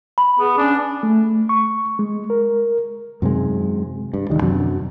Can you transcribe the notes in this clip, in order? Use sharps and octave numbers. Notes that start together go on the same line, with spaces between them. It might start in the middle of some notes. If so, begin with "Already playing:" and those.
B5
B3 G#4
C#4 D4
A3
C#6
G#3
A#4
F#2 C3 D#3 G#3
G2
E1 D#2 D#3 G3
F#2 C3 F#3 D4